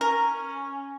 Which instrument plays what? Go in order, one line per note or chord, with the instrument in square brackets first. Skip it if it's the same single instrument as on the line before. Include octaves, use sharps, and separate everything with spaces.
[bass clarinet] C#4 [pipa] A#4